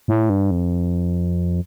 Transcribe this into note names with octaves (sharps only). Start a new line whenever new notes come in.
A2
G2
F2